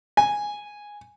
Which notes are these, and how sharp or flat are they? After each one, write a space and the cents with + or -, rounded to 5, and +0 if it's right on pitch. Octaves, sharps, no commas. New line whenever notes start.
G#5 -5